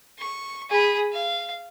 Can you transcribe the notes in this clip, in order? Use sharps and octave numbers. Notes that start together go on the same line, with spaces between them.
C#6
G#4 B5
F5